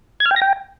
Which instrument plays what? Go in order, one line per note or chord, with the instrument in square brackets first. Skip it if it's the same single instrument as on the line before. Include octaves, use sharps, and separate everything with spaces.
[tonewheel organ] G#6
F6
G5
A#6
G5